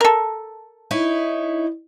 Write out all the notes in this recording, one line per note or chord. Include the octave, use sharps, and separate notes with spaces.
A4 A#4
D#4 E4 C#5